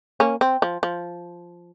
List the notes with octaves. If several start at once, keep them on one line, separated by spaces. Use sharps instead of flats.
A#3 C#4
C4
F3
F3